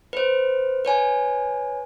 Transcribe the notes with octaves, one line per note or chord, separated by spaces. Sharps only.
B4 C5
B4 C#5 G#5